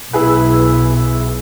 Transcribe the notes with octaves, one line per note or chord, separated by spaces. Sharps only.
B1 E4 G#4 B4